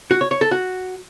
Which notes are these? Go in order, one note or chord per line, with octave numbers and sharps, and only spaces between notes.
F#4
C#5
C#5
A4
F#4